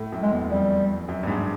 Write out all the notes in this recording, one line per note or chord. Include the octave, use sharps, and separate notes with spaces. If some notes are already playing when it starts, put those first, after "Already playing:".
Already playing: A2
F#2
G#3
E2
F2 G3
F#2
G2
G#2